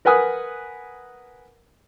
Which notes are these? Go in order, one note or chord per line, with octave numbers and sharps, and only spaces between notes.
A#4 B4 F#5 G#5 D#6 F#6